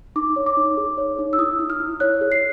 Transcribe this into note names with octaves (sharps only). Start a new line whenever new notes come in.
D#4 D6
C#5
D6
D#4
G#4
C#5
D#4
E6
E4 D#6
E4
F6
E4
C#5 F#6
G#4
C7